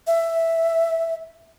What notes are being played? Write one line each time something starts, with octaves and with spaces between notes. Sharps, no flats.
E5